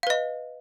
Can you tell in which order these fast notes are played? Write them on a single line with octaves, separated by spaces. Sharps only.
F5 B4 D#5